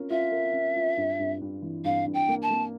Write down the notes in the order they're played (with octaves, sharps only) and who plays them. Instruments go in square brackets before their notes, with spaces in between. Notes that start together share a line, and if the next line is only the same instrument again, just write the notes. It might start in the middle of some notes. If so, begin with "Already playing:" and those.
Already playing: [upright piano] C#4 F4 A#4
[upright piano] F4 [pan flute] E5
[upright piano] A#4
C#4
F4
G2
G2
G2
E3
[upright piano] G2 [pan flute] F5
[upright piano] G2
[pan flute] G5
[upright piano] A#3
[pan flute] A5
[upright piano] A#3